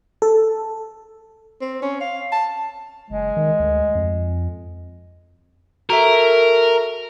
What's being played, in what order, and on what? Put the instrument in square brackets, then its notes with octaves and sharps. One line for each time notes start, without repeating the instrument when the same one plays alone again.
[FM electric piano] A4
[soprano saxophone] C4
C#4
F5
A5
[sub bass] F#1 [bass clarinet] G#3
[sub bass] D#3
D2
F2
[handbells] F#4 A4 E5 [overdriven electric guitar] A#4